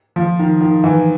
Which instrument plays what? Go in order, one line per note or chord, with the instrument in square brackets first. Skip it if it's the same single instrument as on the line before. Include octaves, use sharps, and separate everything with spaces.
[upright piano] F3
D#3
D#3
E3